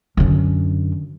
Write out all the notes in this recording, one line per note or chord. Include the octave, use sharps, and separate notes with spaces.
F#2 D3